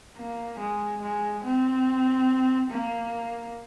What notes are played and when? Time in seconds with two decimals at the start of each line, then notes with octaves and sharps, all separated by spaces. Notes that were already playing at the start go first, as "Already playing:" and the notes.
0.17 A#3
0.60 G#3
1.02 G#3
1.44 C4
2.71 A#3